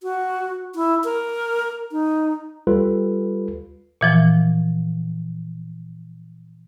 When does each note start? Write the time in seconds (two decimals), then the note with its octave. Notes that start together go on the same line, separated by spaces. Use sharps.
0.03 F#4
0.75 E4
1.04 A#4
1.92 D#4
2.67 G3 F4 A4 B4
4.01 A#2 E3 F3